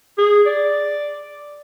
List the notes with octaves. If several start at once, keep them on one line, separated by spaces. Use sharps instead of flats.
G#4
D5